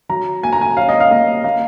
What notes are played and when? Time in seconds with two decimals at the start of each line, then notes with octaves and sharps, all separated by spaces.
0.09 F#3 A#5
0.43 A#3 G#5
0.53 A#5
0.61 G#5
0.77 C#4 F5
0.89 D#5
1.00 F5
1.11 A#3
1.44 A#3 F5